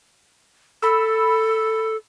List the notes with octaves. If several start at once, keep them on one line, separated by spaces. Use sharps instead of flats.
A4 B5 E6